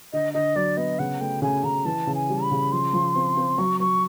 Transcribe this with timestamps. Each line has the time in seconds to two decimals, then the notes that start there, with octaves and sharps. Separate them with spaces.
0.13 D3 D#5
0.34 D3 D#5
0.55 F#3 D5
0.77 B3 D#5
0.99 C#3 F#5
1.20 A3 G5
1.42 C#3 G#5
1.64 C#3 A#5
1.85 E3 A5
2.07 C#3
2.15 G#5
2.29 G3
2.43 B5
2.51 C#3
2.72 F3 C6
2.93 F3
3.15 C4
3.37 C4
3.58 F#3 C#6
3.80 F#3 C#6